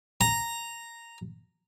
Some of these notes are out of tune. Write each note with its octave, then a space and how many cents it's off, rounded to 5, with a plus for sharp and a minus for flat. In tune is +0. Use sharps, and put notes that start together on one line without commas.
A#5 -5